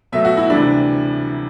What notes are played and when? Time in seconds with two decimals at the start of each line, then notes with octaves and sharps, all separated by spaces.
0.12 B2 F#3 A3 E5
0.25 F#4
0.37 E4
0.50 D2 C3 E3 G3 D4